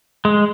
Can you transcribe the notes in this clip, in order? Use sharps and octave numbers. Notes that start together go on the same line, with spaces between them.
G#3